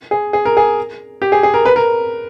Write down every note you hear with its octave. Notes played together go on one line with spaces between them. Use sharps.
G#4
G#4
A#4
G#4
G4
G#4
G#4
A#4
B4
A#4